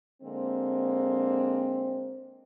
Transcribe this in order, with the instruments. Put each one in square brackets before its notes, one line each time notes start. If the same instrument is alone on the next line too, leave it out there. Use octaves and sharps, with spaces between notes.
[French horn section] D3 G#3 A#3 C4